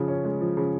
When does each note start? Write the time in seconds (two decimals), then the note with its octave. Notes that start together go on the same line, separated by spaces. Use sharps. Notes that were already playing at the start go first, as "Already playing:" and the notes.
Already playing: C#3 F3
0.08 C#4
0.25 G#3
0.41 F3
0.57 C#3